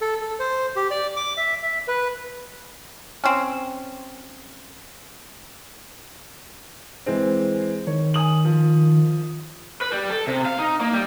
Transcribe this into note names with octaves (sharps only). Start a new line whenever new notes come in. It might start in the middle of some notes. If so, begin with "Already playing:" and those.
A4
A4
C5
G4
D5
D6
E5
E5
B4
C4 C#4
E3 G#3 C4
D#3 C#5
G#5 D#6 F#7
F3
B4
G3
A4
C3
F5
D#4
A#3
G3